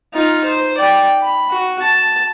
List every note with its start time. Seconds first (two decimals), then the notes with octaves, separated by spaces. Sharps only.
0.14 D#4 F4
0.44 C5
0.77 D5 G5
1.22 B5
1.50 F#4
1.82 A5